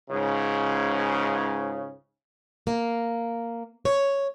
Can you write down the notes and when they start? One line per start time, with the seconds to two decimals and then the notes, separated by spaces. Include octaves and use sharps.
0.10 C#2 G#2 C#3
2.67 A#3
3.85 C#5